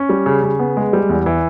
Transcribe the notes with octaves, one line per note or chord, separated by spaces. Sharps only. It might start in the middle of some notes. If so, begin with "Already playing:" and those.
Already playing: C#4
G3
C#3
C#3
B3
G#3
G3
E2
E3